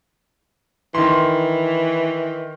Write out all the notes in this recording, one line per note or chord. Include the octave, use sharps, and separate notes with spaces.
D#3 E3 C6